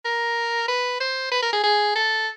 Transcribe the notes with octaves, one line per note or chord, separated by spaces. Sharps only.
A#4
B4
C5
B4
A#4
G#4
G#4
A4